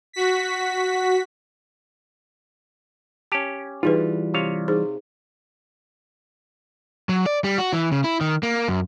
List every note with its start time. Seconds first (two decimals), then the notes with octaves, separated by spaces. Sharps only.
0.13 F#4 B6
3.32 C#4 G4 A5
3.83 E3 G3 D#4 F4 G#4 B4
4.34 C3 C#5 F5
4.68 D#4 G#4 C5
7.09 F#3
7.26 D5
7.44 G3
7.58 F#4
7.73 E3
7.92 C#3
8.04 E4
8.21 D#3
8.43 A#3
8.68 F#2